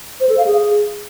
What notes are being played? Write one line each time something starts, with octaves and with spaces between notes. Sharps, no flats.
C5
A4
F5
G#4